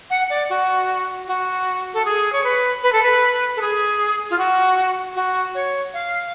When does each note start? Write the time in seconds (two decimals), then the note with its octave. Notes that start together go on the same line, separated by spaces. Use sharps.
0.10 F#5
0.30 D5
0.50 F#4
1.28 F#4
1.94 A4
2.05 G#4
2.32 C#5
2.44 B4
2.83 B4
2.92 A4
3.03 B4
3.56 A4
3.61 G#4
4.30 F4
4.38 F#4
5.16 F#4
5.55 C#5
5.94 F5